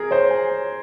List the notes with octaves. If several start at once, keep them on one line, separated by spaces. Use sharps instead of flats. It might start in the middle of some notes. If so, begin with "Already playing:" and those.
Already playing: G#4 A#4
C5 C#5
G#5
C#5